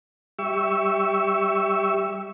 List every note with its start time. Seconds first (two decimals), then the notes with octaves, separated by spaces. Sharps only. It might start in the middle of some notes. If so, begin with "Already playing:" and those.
0.39 G3 G4 E5 C#6 E6